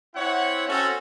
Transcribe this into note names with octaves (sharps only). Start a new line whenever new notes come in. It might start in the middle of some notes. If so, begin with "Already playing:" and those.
C4 E4 C#5 F#5
C4 C#4 F#4 A4